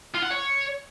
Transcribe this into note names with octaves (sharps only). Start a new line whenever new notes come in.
F4
F#5
C#5